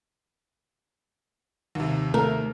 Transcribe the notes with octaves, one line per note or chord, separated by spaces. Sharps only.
D#2 C3
A3 A#4